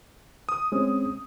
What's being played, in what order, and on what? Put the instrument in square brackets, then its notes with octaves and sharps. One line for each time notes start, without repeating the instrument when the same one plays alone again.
[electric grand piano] D#6
[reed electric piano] G#3 C4 C#4